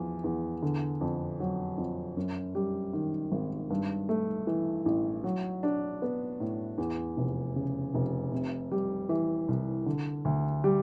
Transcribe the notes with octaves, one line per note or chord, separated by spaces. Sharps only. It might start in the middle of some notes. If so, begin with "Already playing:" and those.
Already playing: E2 F3
E2
D3
F2
F#3
F2
F#2
G3
D#3
G#1
G2
A3
E3
A1
F#3
D4
B3
A2
E2
F1
C#3
F1
C3
G3
E3
C2
D3
D2
G3